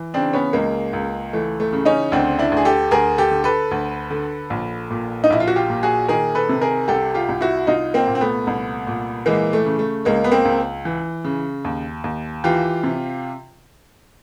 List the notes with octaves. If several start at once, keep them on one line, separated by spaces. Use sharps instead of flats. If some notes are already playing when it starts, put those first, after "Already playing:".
Already playing: E3
C#3 C4 D4
B3 C#4
C#2 G#3 A#3
C#2
E3 A3
A3
C#3
C#4 D#4
D2 C4 D4
D4 E4
D2
G#4
G4 A4
D2 G#4 A#4
G4 A4
D3
A4 B4
D2
D3
A#1
A#2
D#4
A#1 E4
F4
F#4
F4 G4
A#2
F#4 G#4
D#3 G#4 A#4
A4 B4
C3
G#4 A#4
C2 G4 A4
F4 G4
C2
E4 F#4
C2 D#4 F4
A#3 C4
A#2
C4
A3 B3
C2
A#2
E3 G#3 A#3
A3
C#3
A3
C#2 G#3 A#3
B3
A#3 C4
C#2
E3
C#3
D#2
D#2
E3 F4 G4
C3